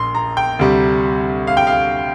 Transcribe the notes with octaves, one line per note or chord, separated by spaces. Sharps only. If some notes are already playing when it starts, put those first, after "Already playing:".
Already playing: A#1 A#2 C6
A#5
G5
D2 C3 G3
F5
G5
F5